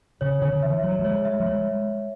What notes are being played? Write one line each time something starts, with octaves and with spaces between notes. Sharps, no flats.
C#3 C#5
D3 C#5
D3
E3 E5
F#3 C#5
F#3
G#3 C#5
E5
F#3
G#3 C#5